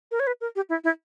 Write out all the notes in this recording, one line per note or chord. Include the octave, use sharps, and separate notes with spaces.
A#4
C#5
B4
A#4
G4
E4
E4